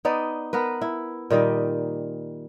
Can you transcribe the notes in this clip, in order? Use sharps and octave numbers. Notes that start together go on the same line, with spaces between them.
B3 D#4 D5
B3 A#4 B4
E4
A#2 D#3 G3 D#5